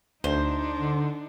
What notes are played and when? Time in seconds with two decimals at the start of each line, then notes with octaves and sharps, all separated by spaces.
0.24 D2 D4 D#4 C5
0.79 D3